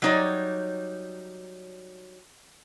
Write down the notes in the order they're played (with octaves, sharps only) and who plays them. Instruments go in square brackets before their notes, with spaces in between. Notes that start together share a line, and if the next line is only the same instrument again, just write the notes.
[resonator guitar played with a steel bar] F#3 G3 D#4 C#5 D5